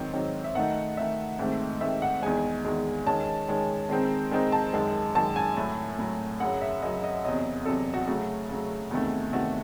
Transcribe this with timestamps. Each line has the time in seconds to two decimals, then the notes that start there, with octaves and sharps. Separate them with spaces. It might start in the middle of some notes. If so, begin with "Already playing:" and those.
Already playing: G#2 D#3 F#3 C4
0.13 G#2 D#3 F#3 C4
0.44 E5
0.55 D#3 A3 D#4 F#5
0.97 D#3 A3 D#4 E5
1.39 G#2 D#3 A3 C4
1.81 G#2 D#3 A3 C4 E5
2.02 F#5
2.22 E2 D#3 G#3 G#5
2.65 E2 D#3 G#3
3.06 D#3 G#3 C#4 A5
3.48 D#3 G#3 C#4
3.89 D#3 G#3 C4 D#4
4.31 D#3 G#3 C4 D#4
4.52 A5
4.73 F#2 D#3 G#3
5.15 F#2 D#3 G#3 A5
5.36 G#5
5.57 A2 F#3 A3
5.99 A2 F#3 A3
6.40 F#2 C#3 F#3 F#5
6.61 E5
6.82 F#2 C#3 F#3 D#5
7.03 D#5
7.24 E2 C3 F#3 D#5
7.65 E2 C3 F#3 A4
7.94 F#4
8.07 C#3 F#3 A3 F#4
8.49 C#3 F#3 A3
8.91 E2 C3 D#3 A3
9.33 E2 C3 D#3 A3 F#4